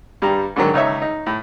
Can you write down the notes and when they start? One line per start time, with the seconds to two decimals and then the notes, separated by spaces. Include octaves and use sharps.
0.22 G2 G3 A#5
0.56 G#2 D3 D#3 F#3
0.74 C#2 D#4 C#5 E5
1.02 D#4
1.26 A2